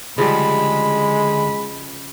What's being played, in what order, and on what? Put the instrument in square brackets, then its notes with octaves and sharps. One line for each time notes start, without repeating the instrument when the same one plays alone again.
[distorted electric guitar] D2 [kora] C#3 F3 G3 [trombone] G#3 [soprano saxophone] B5